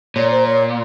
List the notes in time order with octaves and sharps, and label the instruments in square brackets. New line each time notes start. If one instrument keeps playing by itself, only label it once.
[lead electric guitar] A#2 [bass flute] C#5
[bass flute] C5
C#5